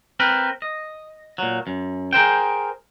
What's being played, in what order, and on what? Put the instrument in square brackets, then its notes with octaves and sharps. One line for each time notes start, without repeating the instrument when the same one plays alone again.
[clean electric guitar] C4 A#4 B4
D#5
A#2 F#3
F#2
G#4 A#4 C5 G5